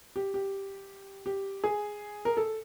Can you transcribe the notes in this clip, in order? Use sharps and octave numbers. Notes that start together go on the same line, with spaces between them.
G4
G4
G4
G#4
A#4
A4